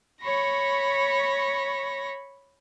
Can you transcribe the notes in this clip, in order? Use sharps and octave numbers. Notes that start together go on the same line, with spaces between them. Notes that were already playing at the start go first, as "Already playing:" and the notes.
C#5 B5 C#6 A#6